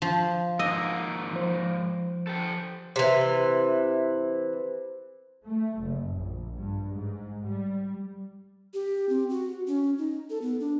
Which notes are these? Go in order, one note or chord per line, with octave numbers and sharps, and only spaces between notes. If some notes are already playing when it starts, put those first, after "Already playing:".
F3
G#2 A#3 D#5 E6
F3 C5
G4 A4
C3 E3
A3
F#1
A#1
G2
G#2
G3
G4
C4
F#4
C#4
D#4
A4
B3
D4